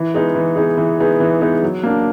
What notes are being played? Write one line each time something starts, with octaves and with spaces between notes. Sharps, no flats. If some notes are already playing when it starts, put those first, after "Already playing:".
Already playing: E3
G#3 B3 D#4 G#4
E3
G#3 B3 D#4 G#4
E3
G#3 B3 D#4 G#4
E3
G#3 B3 D#4 G#4
F#3
A#3 D4